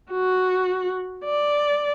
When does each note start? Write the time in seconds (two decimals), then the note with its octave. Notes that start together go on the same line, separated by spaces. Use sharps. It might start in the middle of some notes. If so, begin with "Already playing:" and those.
0.11 F#4
1.24 D5